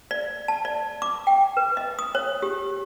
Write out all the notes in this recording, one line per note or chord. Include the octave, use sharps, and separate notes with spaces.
D5
A5
D5
D6
G5
B4
D#5
D#6
C#5
G4